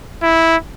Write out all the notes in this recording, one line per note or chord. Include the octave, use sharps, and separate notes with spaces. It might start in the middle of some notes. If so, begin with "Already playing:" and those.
E4